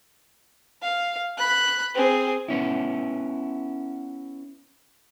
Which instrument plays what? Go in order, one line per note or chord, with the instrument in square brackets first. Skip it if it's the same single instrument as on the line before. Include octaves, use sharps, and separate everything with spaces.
[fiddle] F5
B5 F#6
C4 G#4
[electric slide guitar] B3 C#4 E4